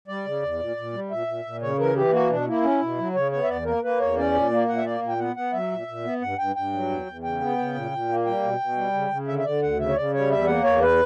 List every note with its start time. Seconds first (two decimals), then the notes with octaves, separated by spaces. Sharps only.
0.08 G3 D5
0.26 C#3
0.42 E2
0.59 A#2
0.76 A#2
0.93 G3
1.11 A#2 E5
1.27 A#2
1.45 A#2
1.62 C#3 C#5
1.79 E3 A#4
1.96 E3 G4
2.12 A#3 F#4
2.29 B2 D4
2.47 A#3 E4
2.63 C#4
2.81 B2
2.98 F#3
3.14 C#3 C#5
3.32 B3 C#5
3.44 E5
3.48 E2 D5
3.65 A#3 A#4
3.83 A#3 B4
4.00 E2 C#5
4.17 C#4 D5
4.34 A#2
4.51 A#3
4.68 A#2 F#5
4.77 E5
4.85 A#3 D5
5.02 A#2
5.09 G5
5.19 B3 F#5
5.36 B3 F#5
5.53 F#3 E5
5.71 A#2
5.87 A#2
6.04 B3
6.22 G2 F#5
6.39 G2 G5
6.56 G2 G5
6.73 F#3
6.90 E2
7.06 E2
7.23 C#3 G5
7.40 B3
7.58 C#3
7.75 A#2
7.91 A#2
8.09 A#3
8.26 G3 G5
8.43 B2
8.60 B2
8.77 G3
8.94 C#3
9.11 C#3
9.28 D3 E5
9.39 E5
9.45 D3 D5
9.62 D2 F#5
9.79 C#3 E5
9.89 C#5
9.96 C#3 D5
10.14 G3 C#5
10.30 E2 E5
10.47 A#3 F#5
10.64 E2 C#5
10.82 B4